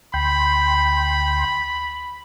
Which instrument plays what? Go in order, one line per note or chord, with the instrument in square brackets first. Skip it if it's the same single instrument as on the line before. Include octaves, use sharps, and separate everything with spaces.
[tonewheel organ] D2 G5 C6 [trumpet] B5